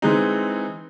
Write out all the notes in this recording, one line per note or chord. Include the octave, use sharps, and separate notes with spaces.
E3 G#3 C4 D#4